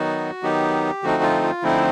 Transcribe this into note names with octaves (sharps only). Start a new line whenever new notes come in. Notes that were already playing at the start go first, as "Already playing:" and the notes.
Already playing: D#3 F#3 B3 D#4 F#4
D#3 F#3 B3 D#4 G4
D3 F3 A3 C4 D#4 F#4
F4
F4
D3 F3 A3 C4 D#4 E4